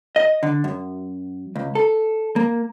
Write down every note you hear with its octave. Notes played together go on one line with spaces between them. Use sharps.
D#5
D3
F#2
C#2
A4
A#3